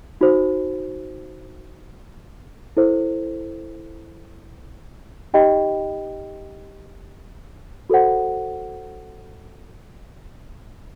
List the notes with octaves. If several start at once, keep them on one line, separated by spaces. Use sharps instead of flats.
D#4 F#4 C5
E4 A4 C5
D#4 G4 D#5 G5 B5
F#4 A4 C5 F#5